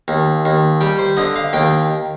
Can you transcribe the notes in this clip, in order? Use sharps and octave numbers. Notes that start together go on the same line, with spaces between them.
D#2
D#2
G3 G5
C5
D3 D#5
F5
D#2 G5